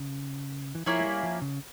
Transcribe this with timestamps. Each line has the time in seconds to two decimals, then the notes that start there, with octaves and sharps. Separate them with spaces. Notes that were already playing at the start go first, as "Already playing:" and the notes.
Already playing: C#3
0.75 E3
0.86 F3 A#3 C#4 E4 G#4
0.99 G#3
1.05 G3
1.23 F3
1.42 C#3